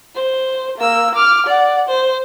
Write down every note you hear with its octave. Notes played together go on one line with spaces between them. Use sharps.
C5
A#3 E6
D6 F6
D5 F#5
C5